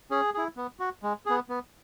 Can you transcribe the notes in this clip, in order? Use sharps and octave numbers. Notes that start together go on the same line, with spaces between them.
C#4 G#4
E4 G#4
B3
F#4
G#3
B3 G#4
B3